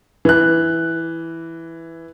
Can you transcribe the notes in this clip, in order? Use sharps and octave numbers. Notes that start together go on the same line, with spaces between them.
E3 F#6